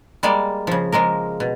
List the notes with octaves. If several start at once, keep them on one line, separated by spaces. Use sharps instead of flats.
G3 G#3 A#3 D5
C#3 F3
F3 G#3 A#3 A#4
B2